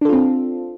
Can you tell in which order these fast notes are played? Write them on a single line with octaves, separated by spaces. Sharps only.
D4 A4 F4 C4